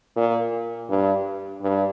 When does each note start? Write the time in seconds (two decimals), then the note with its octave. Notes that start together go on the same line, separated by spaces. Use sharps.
0.16 A#2
0.89 G2
1.62 G2